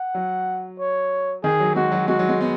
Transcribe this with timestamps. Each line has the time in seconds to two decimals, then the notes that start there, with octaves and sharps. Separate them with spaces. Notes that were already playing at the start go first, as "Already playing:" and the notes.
Already playing: F#5
0.15 F#3
0.79 C#5
1.43 D#3 G#4
1.60 F#3
1.76 G#3 F#4
1.92 F#3
2.08 G#3 F#4
2.19 F#3
2.29 G#3
2.41 B3